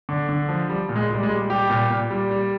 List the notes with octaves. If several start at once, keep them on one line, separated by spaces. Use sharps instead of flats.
D3
D3
F3
G3
A#2
G#3
A#2 G3
G#3
G3
G3 G4
A#2
A#2
G3
G3